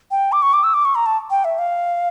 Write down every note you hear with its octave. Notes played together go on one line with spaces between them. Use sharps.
G5
D6
C#6
D6
E6
D6
C#6
A#5
A5
G5
E5
F5